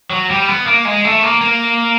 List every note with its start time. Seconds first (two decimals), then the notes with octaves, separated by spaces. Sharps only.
0.11 F#3
0.30 G3
0.48 B3
0.66 A#3
0.85 G#3
1.04 A3
1.23 A#3
1.41 A#3